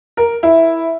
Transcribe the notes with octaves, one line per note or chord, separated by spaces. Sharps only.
A#4
E4